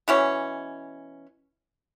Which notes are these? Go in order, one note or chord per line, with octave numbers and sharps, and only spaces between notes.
B2 E3 C#4